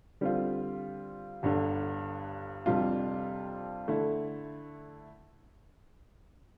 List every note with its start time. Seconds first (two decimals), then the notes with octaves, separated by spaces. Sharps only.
0.21 D3 G3 C4 F4
1.43 G1 G2 D3
2.66 F2 C3 G3 D4 F4
3.88 D3 A3 E4